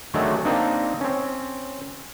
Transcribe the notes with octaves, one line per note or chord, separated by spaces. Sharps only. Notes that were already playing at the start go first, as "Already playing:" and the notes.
D3 D#3 F#3 G#3 A3
A#3 C4 D4 D#4
C4 C#4